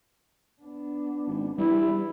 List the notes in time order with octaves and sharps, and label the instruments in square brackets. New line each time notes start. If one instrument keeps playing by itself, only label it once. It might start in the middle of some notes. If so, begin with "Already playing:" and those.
[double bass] B3 D4
[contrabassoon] G#1
[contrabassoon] E3 [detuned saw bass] G3 [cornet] E4